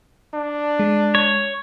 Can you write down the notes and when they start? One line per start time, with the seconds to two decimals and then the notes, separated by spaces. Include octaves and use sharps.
0.34 D4
0.79 G#3
1.15 C#5